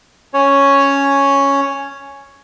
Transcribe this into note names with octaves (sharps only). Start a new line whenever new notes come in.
C#4 C#5